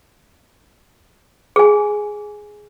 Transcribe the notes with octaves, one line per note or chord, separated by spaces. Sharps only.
G#4 G#5